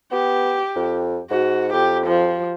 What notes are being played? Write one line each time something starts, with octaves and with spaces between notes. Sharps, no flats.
B3 G4
F2
G#2 F#4
F2 G4
F3